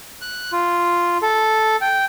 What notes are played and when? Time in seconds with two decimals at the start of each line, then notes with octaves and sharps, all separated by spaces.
0.21 F#6
0.52 F4
1.22 A4
1.81 G5